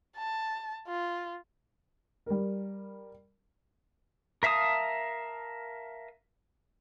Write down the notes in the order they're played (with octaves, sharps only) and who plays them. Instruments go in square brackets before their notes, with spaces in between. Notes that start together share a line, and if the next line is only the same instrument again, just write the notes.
[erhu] A5
F4
[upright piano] G3 A#4
[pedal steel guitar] A#4 E5 F5 A5 D#6